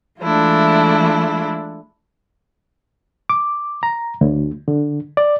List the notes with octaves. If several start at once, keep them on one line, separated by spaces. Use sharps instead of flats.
E3 G#3 A3 D4 E4 F4
D6
A#5
D2
D3
D5